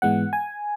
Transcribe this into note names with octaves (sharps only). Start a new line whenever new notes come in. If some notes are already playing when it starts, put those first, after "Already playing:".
G#2 E3 G#3 B3 F#5
G#5